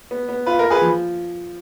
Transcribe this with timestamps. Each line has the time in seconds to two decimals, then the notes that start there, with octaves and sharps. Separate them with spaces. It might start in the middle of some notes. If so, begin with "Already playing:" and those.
0.11 B3
0.29 B3
0.46 F4 B4
0.59 F4 A#4
0.70 G#4 B4
0.81 F3